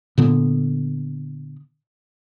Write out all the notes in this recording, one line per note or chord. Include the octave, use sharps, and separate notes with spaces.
A#2 D3 B3